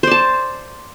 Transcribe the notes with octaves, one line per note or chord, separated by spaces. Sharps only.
C5 D5 A5